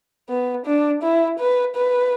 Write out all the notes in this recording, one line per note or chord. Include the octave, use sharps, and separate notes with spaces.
B3
D4
E4
B4
B4